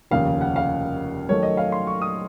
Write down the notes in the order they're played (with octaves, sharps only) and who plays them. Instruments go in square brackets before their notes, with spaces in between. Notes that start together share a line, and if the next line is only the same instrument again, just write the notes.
[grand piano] F1 D#2 C#3 F5
F#5
F5
F#2 D#3 A3 C#5
D#5
F5
C6
C#6
D#6